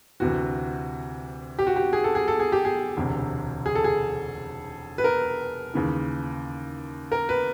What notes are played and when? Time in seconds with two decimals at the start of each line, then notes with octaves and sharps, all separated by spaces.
0.20 D2 C3 E3 F#4
1.59 G4
1.67 F#4
1.76 G4
1.93 G#4
2.04 A4
2.15 G#4
2.28 A4
2.40 G#4
2.52 G4
2.65 G#4
2.97 E1 D2 C3
3.66 G#4
3.75 A4
3.84 G#4
4.98 B4
5.04 A#4
5.74 D#2 C#3 E3
7.12 A#4
7.29 B4